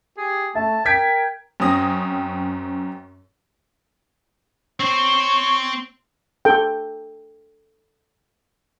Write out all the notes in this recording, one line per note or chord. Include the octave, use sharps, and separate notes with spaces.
G4 G#4
A3 E5 A5
A#4 G5 G#6 B6 D7
F#2 C4 C#4 D#6 A#6
C4 C5 C#5
A4 G5